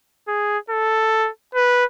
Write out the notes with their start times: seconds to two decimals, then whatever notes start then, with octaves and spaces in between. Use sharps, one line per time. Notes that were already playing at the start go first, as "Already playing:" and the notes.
0.28 G#4
0.70 A4
1.55 B4